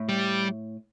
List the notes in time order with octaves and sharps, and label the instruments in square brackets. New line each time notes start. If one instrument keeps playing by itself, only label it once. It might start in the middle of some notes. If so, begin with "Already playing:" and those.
Already playing: [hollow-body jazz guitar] A2
[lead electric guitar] G3